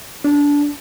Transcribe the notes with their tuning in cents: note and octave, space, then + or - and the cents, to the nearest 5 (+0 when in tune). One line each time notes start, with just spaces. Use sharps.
D4 -20